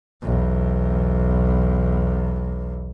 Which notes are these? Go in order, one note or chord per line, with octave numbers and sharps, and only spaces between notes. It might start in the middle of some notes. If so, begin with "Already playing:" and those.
B1 E2